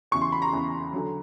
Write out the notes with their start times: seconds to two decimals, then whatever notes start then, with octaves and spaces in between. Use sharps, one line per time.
0.11 E2 C#3 E3 C#6
0.22 C6
0.32 B5
0.42 A#5
0.52 E2 C#3 E3
0.93 D3 F#3